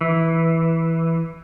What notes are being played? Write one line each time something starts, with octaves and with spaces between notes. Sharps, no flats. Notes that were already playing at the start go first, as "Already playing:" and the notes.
E3